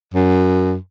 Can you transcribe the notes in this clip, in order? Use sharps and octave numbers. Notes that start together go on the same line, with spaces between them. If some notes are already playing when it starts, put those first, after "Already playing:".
F#2